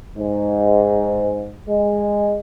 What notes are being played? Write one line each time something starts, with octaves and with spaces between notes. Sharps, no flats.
G#2
G#3